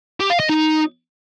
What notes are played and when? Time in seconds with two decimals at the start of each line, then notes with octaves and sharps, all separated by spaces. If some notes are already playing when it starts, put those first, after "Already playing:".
0.20 G4
0.30 F5
0.40 D#5
0.49 D#4